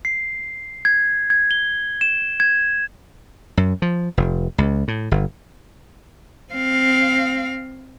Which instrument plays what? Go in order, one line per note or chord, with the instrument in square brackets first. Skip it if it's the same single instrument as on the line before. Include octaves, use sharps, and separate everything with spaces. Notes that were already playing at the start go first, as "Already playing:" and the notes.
[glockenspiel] C7
G#6
G#6
G7
E7
G#6
[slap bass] F#2
F3
F1
C#2
A2
G1
[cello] C4 F5